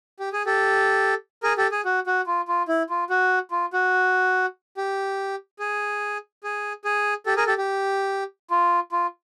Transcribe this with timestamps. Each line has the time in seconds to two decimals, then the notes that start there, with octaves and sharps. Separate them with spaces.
0.19 G4
0.33 G#4
0.46 G4 A4
1.43 G#4 A#4
1.58 G4 A4
1.71 G#4
1.85 F#4
2.07 F#4
2.27 F4
2.48 F4
2.68 E4
2.90 F4
3.10 F#4
3.51 F4
3.73 F#4
4.77 G4
5.59 G#4
6.44 G#4
6.85 G#4
7.26 G4 A4
7.36 G#4 A#4
7.47 G4 A4
7.58 G4
8.51 F4
8.92 F4